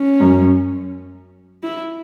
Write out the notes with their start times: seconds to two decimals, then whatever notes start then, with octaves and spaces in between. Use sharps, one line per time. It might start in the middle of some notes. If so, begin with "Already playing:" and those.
Already playing: C#4
0.20 F#2
1.63 E4